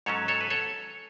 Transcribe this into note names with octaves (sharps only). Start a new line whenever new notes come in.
G#2 F#3 C#4 A4 C#5
A4 C#5
B4
A4 C#5